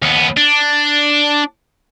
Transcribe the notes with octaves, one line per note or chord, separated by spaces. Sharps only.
D#2 B3
D4